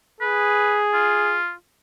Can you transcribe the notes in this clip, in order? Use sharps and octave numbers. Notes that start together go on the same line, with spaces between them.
G#4 B4
F4